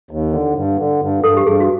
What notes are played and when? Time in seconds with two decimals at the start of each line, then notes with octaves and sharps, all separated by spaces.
0.11 D#2
0.32 D3
0.55 G2
0.79 D3
1.02 G2
1.24 G2 A4
1.37 G4
1.47 G2 G#4
1.60 F#4